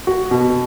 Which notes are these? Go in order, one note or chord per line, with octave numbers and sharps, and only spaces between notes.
F#4
B2